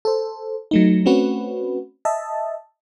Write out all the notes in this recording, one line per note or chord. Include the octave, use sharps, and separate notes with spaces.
A4 C5
F#3 A3 D#4
A3 C4 C#4 F#4 B4
D#5 E5 A5